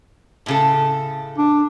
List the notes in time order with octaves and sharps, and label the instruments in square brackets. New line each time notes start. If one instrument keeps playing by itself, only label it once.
[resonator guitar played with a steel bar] A2 C#3 A4
[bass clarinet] D4